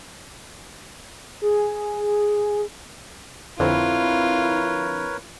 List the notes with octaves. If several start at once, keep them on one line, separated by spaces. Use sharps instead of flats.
G#4
F2 D3 C4 E4 F4 A#4 B4 C#5